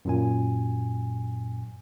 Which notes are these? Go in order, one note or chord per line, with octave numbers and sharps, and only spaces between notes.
F#2 A#2 G#5